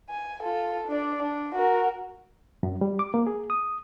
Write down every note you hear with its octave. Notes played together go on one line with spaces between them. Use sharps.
G#5
F4 A4
D4 D5
D4
F#4 A#4
F#2
G3
D6
A#3
G#4
D#6